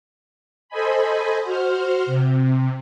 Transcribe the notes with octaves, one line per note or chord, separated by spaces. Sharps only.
A4 C5 D#5 G#5 B5
F#4 C5 F6
C3